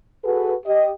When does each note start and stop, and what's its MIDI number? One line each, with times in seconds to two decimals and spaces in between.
0.25 0.54 66
0.25 0.54 68
0.25 0.54 69
0.25 0.54 71
0.66 0.89 67
0.66 0.89 75